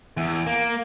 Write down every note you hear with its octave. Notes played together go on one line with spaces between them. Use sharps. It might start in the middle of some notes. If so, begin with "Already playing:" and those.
E2
A#3